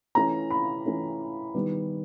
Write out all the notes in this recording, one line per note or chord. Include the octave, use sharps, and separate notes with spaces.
E3 A3 C#4 A#5
B5
E3 A3 C#4
D#3 G3 B3